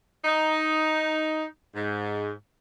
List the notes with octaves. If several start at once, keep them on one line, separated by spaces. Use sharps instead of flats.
D#4
G#2